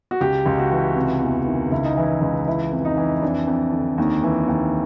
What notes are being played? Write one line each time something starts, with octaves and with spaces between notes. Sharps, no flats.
F#4
C#2 G4
C#2
F#4
E3
C3
E2
D#3
C#2 E4
D#4
E3 E4
C#2
E3 E4
F2
D#4
E3
F2 D4
F2
D3
D#2
E3
D#2